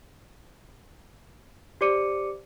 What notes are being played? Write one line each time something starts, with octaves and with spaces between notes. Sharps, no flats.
G4 C5 D5 D6 C#7 D#7